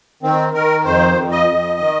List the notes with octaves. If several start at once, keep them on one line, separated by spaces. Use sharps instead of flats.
D#3 C4
D#3 A#4
F2 C5
F2
D#5
F2
D#3